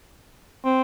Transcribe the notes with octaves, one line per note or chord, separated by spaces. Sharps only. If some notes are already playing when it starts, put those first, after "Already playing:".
C4